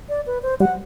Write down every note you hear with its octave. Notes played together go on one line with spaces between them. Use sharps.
D5
B4
C5
G3 F#5